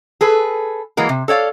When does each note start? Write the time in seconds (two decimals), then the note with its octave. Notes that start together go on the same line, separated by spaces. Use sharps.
0.21 G#4 A4 B4
0.97 E3 F#3 G#3 A#3 A#4
1.09 C3
1.28 A4 C#5 D5 F5